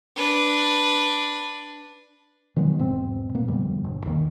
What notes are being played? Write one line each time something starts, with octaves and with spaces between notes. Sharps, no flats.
D4 B4
D#3 F#3 G#3 B3
E1 G#2 B2 C4
A#2 A#3 B3
F2 B2 D3 G3
G1
D#2 D#3 A#3